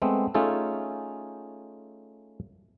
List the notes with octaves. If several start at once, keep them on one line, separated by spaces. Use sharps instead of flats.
G#3 A3 B3 C4
A3 C#4 D#4 F4 G#4 A4